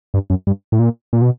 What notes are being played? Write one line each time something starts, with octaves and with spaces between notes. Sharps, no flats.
G2
F#2
G2
A2
A#2
A#2
B2